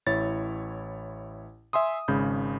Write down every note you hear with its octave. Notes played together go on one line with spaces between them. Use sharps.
A1 E4 C#5 A6
E5 G#5 C6 D#6
G#1 C#3 G#3 B5 G6